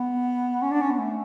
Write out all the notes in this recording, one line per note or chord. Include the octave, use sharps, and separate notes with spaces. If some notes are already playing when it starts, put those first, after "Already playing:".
Already playing: B3
C#4
D4
C#4
B3
A3